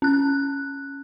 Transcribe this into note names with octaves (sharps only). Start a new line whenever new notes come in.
C#4 F#6